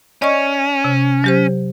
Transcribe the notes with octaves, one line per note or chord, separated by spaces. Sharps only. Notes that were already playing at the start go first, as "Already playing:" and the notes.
C#4 D5 D#5 C#6
C3
F#3 G4 C5